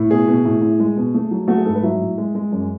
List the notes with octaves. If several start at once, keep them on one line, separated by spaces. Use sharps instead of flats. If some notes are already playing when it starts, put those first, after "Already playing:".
Already playing: A2
B2 G#4
B2
A2
A2
G#3
B2
A3
F#3
A3 F#4
G#4
G#2 A4
B4
F#3 E5
A2
G#3
G#3
F#2